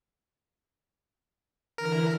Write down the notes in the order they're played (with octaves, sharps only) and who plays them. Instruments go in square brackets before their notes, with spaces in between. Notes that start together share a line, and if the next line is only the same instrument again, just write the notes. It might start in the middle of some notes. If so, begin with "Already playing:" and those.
[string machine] D3 E3 E4 [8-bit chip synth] A#4